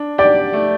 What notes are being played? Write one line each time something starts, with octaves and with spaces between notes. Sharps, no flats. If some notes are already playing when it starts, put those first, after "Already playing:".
Already playing: D4
G4 D5
A3